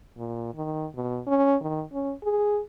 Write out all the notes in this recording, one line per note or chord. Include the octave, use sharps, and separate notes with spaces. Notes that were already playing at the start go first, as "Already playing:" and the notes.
A#2
D#3
B2
C#4
D#3
C#4
G#4